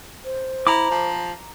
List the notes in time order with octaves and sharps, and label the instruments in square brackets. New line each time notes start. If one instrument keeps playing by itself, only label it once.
[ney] C5
[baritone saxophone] E4 [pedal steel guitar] A#5 D6
[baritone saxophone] F3